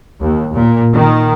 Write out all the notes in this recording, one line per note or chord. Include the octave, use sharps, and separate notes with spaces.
D#2
A#2
D#3